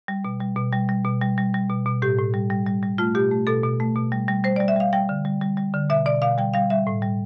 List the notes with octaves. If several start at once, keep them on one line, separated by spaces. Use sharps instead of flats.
G3
B2
G3
B2
G3
G3
B2
G3
G3
G3
B2
B2
A2 G4
A2
G3
G3
G3
G3
A3 F4
B2 G4
A3
B2 A4
B2
A3
B2
G3
G3
G3 C5
D5
G3
E5
G3 F5
G3 G5
D3
G3
G3
G3
D3
B2 E5
B2 D5
B2 F5
G3 G5
G3 F5
G3 E5
A2
G3